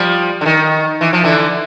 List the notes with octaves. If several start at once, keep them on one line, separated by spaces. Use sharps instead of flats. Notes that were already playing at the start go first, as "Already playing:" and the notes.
Already playing: F3 G3
D3
D#3
E3
F3
D3 E3